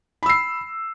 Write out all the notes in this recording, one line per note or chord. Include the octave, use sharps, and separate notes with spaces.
B5 E6 C7